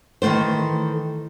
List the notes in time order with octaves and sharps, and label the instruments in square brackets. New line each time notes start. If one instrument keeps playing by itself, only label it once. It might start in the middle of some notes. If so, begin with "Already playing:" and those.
[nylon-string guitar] D#3 E3 F#3 A3 C5